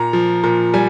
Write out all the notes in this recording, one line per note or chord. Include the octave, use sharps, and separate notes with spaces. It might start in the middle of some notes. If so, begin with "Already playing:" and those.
Already playing: A#2 A#5
F3
A#2
G3 G#5